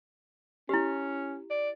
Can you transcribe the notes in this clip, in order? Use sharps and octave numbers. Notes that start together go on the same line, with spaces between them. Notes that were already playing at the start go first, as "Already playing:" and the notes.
C#4 E4 G4
D5